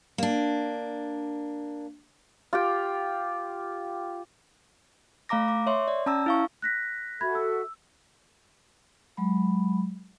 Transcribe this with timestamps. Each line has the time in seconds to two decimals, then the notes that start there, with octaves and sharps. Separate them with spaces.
0.18 A#3 D4
2.53 F4 G4 G5
5.29 A3 F5 A#5 D6 A#6
5.48 D6
5.67 C#5 E5 C6 C#6
5.88 D5
6.06 C#4 A5 A#5 E6
6.26 E4 F5 C#6
6.62 F#6 A#6 B6
7.21 F#4 A4 E5 B5 G#6
7.35 E6
9.17 F#3 G#3 B5